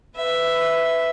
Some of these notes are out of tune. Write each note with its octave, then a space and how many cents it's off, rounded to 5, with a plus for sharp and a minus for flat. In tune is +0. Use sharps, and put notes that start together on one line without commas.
B4 +20 E5 +0